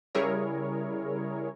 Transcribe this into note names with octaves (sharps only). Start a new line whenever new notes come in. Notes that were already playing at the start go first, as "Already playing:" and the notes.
C#3 G3 E4 G#4 A#4 C#5